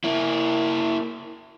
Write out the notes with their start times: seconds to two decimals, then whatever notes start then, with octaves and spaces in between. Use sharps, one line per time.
0.04 A#3 E4